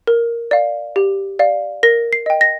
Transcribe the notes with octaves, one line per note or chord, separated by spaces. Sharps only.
A#4
D5 F5
G4
D5 F5
A#4 A#6
C7
D#5 G5
A#6